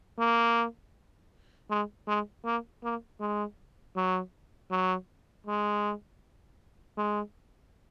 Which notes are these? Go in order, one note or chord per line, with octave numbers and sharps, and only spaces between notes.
A#3
G#3
G#3
A#3
A#3
G#3
F#3
F#3
G#3
G#3